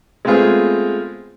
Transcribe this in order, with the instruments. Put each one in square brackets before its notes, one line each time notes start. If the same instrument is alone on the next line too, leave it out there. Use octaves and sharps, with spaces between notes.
[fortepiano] G#3 A3 B3 C4 F4 G#4